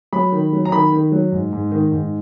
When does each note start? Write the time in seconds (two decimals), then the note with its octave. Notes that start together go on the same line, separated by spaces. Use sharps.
0.13 F#3 B5
0.32 D#3
0.53 F#3
0.65 A#5
0.72 D#3 B5
0.92 D#3
1.12 F#3
1.32 G#2
1.53 G#2
1.71 D#3
1.92 G#2